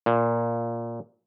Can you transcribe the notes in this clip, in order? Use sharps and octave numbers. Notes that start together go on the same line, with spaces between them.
A#2